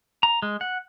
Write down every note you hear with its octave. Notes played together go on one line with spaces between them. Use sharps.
A#5
G#3
F#5